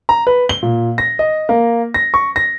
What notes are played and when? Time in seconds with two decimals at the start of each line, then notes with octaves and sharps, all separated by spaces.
0.09 A#5
0.27 B4
0.49 G7
0.63 A#2
0.98 A#6
1.19 D#5
1.49 A#3
1.94 A#6
2.14 C#6
2.36 A#6